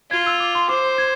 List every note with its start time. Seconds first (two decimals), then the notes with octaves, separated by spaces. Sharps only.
0.11 F4 G#6
0.26 E6
0.40 D6
0.55 C6
0.69 C5 D6
0.98 G#6